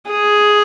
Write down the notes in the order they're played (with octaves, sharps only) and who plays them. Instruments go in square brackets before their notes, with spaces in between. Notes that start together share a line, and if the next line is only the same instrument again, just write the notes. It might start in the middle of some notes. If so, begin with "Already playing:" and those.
[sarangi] G#4